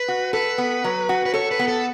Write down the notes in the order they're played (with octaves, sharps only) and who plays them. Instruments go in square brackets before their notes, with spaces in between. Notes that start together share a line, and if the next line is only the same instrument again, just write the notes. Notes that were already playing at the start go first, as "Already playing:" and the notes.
Already playing: [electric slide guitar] B4
[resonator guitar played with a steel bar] F#4
[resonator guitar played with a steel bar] A4 [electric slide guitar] B4
[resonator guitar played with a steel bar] B3
F#3
F#4
[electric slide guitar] B4
[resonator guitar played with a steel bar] A4 [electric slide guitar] C#5
[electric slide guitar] B4
[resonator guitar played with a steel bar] B3
[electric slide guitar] A4